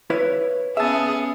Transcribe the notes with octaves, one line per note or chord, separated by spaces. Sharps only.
E4 B4 C#5
B3 C#4 G#4 E5 A5